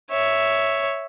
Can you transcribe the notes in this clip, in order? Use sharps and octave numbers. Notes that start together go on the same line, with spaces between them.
C#5 E5